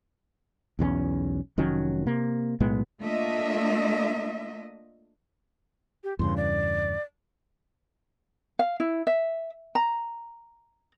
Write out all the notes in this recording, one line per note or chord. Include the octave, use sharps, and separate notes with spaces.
B1 E2 F#3 C#4
F1 D#3 F#3 C#4
C3 A#3
B1 A2 G#3 B3
A3 A#3 D4 F4 D#5 E5
G4
E2 G2 C#3 C6
D5
F5
E4
E5
A#5